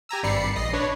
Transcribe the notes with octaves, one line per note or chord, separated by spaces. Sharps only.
G4 G#5 A#5 E6
G#1 G2 D5 B5 C7 C#7
A#1 D#5 A#6 C7
D4 B4 C#5